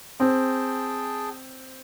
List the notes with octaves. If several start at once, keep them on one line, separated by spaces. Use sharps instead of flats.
C4 G#4 G5 A5